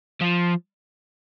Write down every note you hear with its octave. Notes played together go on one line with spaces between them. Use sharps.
F3